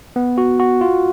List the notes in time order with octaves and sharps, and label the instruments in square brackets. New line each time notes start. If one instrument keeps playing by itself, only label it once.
[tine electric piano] B3
F#4
F#4
F4